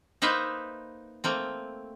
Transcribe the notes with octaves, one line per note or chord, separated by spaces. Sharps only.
A#3 D#4 B4 C5 E5
A3 A#3 C4